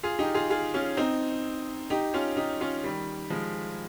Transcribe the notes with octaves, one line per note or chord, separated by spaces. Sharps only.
F4 G#4
D#4 G4
F4 G#4
F4 G#4
C#4 F4
C4 D#4
D#4 G4
C#4 F4
D#4 G4
C#4 F4
D#3 G3
F3 G#3